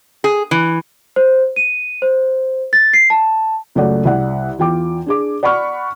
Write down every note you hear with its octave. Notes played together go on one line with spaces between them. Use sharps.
G#4
E3
C5
D#7
C5
A6
C7
A5
C#2 F#2 A3 F#4 D5 F#5
C2 D5 F#5
E2 F4 G5 D6
D4 G#4 D6
D5 F#5 B5 C#6 F6